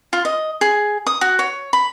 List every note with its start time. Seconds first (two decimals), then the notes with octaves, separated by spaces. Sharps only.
0.13 F4
0.25 D#5
0.61 G#4
1.07 D#6
1.21 F#4
1.39 C#5
1.73 B5